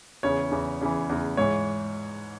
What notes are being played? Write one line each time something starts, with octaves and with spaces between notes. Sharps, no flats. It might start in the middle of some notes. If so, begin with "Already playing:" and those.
E2 C#3 E3 C#5
E2 C#3 E3
E2 C#3 E3
E2 C#3 E3
G#2 E3 C#5